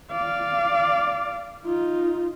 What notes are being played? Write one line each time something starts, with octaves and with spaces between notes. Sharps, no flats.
D5 F5
D#4 F4